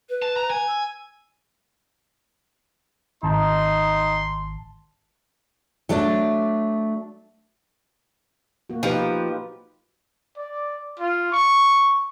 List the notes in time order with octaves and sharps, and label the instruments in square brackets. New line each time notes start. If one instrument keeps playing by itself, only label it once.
[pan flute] B4
[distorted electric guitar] A5
A#5
G#5
[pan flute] E6
[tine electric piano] G#1 A5 [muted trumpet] D#4 [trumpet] C6
[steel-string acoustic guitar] F#3 A3 D4
[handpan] A#3 F#4
[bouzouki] F3 [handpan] D#4 G4 B4
[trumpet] D5
F4
C#6